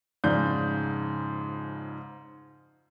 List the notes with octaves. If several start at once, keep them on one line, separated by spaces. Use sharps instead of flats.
F2 G#2 C#3 D5 G6